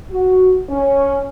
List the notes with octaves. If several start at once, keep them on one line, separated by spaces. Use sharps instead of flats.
F#4
C#4